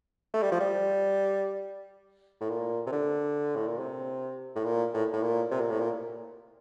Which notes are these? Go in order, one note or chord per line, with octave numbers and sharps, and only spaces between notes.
A3
G3
F3
G3
A2
A#2
C3
D3
A2
A#2
C3
A2
A#2
A2
A2
A#2
C3
A#2
A2
A#2